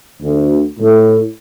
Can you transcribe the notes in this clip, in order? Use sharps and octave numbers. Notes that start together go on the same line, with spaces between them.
D2
A2